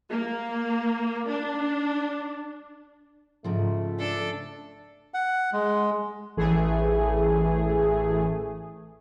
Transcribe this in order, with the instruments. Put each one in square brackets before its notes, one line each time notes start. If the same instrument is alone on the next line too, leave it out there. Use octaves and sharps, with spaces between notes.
[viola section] A#3
D4
[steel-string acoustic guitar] G#2 C#3 F3 [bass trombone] A3
[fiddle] D4 A4
[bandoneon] F#5
G#3
[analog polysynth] A1 E3 A3 G#4